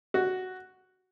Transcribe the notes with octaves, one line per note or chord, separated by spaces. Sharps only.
F#4